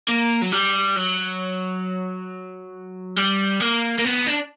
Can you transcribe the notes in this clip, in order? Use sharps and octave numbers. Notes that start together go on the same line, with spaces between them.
A#3
F#3
G3
F#3
G3
A#3
A#3
B3
D4